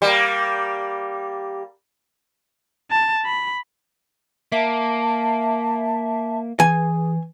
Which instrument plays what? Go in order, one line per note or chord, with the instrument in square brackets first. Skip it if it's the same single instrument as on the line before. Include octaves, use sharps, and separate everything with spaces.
[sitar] G3 A#3
[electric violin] A5
B5
[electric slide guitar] A#3 [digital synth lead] E5 [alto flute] A5
[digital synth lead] E3 [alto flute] G#4 [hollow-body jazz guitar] G#5